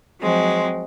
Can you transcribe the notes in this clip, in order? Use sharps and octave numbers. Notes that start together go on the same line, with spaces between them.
F3 F#3 G#3 C4